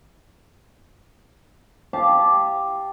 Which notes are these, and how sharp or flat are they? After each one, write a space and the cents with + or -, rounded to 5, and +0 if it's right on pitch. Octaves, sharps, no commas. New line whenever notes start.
G4 +0 F5 +0 A5 -15